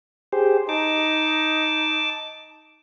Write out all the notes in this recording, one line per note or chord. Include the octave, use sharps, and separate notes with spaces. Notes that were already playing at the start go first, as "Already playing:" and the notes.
G4 G#4 C5
D#4 A5 D6